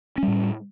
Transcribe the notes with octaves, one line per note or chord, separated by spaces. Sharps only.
A2 G3 C#4